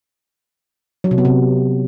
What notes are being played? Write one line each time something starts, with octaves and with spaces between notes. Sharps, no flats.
F#3
C3
B3
C3